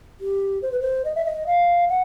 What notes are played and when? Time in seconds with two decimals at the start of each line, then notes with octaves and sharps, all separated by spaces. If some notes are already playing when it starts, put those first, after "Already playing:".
0.20 G4
0.62 C5
0.72 B4
0.80 C5
1.05 D#5
1.15 E5
1.25 D#5
1.46 F5
1.88 F#5